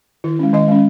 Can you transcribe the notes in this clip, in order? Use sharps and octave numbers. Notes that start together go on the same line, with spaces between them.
D#3 E4
G#3 C#4
D#3 D#5
G#3 C#4